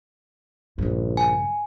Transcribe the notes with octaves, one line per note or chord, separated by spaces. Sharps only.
A#1 G2 C#3
G#5